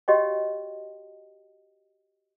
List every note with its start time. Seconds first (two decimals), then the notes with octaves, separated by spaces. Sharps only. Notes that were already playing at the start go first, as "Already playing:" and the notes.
0.08 F#4 G4 C#5 D#5 F5 G5